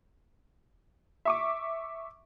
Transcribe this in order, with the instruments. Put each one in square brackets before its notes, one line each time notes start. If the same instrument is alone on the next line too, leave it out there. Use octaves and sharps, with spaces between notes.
[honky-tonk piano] E5 C#6 D6